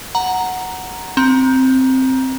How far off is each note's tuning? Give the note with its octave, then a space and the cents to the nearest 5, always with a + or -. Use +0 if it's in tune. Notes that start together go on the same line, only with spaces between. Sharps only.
F#5 +0 A#5 +0
C4 +0 A#5 +15